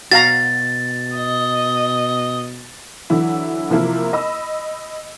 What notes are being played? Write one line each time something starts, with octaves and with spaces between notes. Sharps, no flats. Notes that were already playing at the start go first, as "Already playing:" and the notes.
B2 F#4 F5 A#5 A6
D#5
D3 E3 F#3 E4
C3 F3 A#3 E4 A#4
D#5 B5 E6